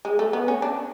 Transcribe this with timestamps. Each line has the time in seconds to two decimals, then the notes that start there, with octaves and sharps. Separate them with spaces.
0.05 G#3
0.19 A3
0.33 B3
0.48 C#4
0.62 D4